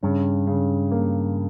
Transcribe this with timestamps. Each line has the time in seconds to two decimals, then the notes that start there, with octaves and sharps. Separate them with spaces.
0.03 G2 C#3
0.47 C#3
0.91 A#3